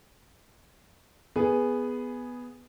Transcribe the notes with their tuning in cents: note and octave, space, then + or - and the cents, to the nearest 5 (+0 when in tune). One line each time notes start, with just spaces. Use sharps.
B3 +0 G#4 +0